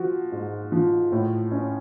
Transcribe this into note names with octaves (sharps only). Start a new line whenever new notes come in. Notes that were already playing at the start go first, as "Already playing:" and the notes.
Already playing: F3 F#4
G#2
F3
A2
C#4